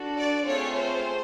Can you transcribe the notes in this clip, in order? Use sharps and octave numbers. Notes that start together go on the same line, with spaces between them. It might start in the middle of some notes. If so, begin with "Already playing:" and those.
Already playing: D4 F#4 A4
D5
A3 C4 F4 G#4 C#5
C5